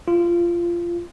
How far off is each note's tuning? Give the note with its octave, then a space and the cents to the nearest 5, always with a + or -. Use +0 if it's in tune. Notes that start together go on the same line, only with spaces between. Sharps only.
F4 -20